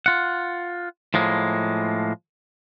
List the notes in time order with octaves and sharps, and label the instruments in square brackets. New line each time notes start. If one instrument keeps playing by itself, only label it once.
[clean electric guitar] F4 F#5
A2 F3 G#3 A#3